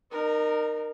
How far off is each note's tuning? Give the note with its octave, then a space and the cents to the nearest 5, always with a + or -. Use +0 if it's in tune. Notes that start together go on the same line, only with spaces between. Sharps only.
D#4 -35 A#4 +0